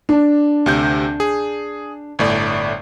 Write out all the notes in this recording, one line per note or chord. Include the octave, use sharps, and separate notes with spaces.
D4
D2 C3 G6
G#4
G1 A2 D5